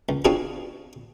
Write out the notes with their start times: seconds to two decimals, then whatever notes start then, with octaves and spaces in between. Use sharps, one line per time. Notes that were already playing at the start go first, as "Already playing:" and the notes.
0.09 C#2
0.25 C4 D4 F4 F#4 G#4 B4